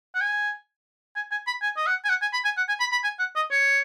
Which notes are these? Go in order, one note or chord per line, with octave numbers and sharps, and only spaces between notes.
F#5
G#5
G#5
G#5
B5
G#5
D#5
F#5
G#5
F#5
G#5
B5
G#5
F#5
G#5
B5
B5
G#5
F#5
D#5
C#5